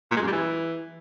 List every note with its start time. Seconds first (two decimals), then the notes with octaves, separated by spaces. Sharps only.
0.11 A#2
0.16 G#3
0.22 F#2
0.27 G3
0.32 E3